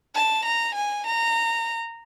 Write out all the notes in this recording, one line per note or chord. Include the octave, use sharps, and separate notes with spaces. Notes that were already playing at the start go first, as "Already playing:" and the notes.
A5
A#5
G#5
A#5